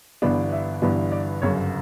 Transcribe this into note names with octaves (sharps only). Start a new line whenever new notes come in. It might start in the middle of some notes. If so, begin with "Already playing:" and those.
G1 G2 E3 B3 D4
E5
G1 G2 E3 B3 D4
D5
G1 F#2 C#3 F#3 C#5